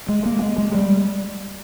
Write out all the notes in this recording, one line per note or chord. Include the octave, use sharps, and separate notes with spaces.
G#3
A#3
G#3
G#3
G3